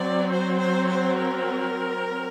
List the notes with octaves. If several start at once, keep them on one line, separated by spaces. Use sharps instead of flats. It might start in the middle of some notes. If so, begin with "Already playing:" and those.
Already playing: F#3 C4 D5
C5
C5
C5
A#4